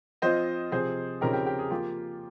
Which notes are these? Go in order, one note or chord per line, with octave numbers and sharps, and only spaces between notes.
F3 C4 F4 C5 D#5
C3 F3 C4 G#4 C5
C#3 F3 C4 D#4 G4 A#4
G4
G4
G#4
F3 A#3 F4 G4